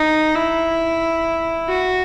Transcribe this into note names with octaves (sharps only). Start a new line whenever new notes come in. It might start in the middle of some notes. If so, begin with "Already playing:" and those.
Already playing: D#4
E4
F#4